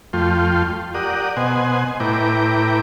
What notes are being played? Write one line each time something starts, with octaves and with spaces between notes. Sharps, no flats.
F2 A3 F4 G5 C6
G4 A#4 D5 F#5 D#6
B2 C5 D#5 F#5 G#5
A2 E4 B4 G5 A#5 D6